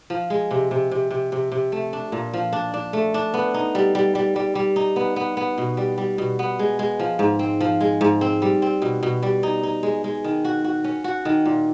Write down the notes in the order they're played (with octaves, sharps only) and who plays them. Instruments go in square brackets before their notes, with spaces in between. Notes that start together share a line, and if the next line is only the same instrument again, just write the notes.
[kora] F3
G#3
C3
C3
C3
C3
C3
C3
A3
D4
A#2
F3
D4
D4
A3
D4
B3
D#4
G3
G3
G3
G3
G3
D#4
B3
B3
B3
B2
G3
G3
B2
B3
G#3
G#3
F3
G#2
C4
F3
G#3
G#2
C4
G3
C4
B2
B2
G3
D#4
D#4
G#3
G#3
D#3
F#4
F#4
C#4
F#4
D#3
A#2